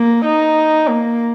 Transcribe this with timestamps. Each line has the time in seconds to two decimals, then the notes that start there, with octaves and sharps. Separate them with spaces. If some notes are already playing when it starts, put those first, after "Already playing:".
Already playing: A#3
0.25 D#4
0.88 A#3